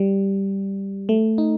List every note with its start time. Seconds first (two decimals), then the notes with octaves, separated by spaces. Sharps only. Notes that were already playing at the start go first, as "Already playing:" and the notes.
Already playing: G3
1.09 A3
1.38 D#4